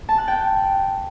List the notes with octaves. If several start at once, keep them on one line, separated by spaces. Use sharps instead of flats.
A5
F#6
G5